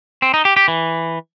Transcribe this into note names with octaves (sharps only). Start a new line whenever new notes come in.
C4
D#4
G4
G4
E3